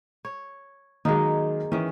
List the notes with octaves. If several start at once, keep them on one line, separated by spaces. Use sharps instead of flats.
C#5
D#3 F#3 G#3 A#3 D#4
D#3 E3 C#4